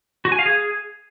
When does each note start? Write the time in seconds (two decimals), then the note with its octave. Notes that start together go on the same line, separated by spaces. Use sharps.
0.25 F#4
0.32 G#5
0.39 F5
0.46 G#4